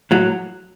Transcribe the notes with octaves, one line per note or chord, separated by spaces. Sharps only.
A2 F#3